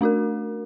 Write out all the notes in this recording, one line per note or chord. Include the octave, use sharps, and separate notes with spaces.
A3 D4 F#4 A#4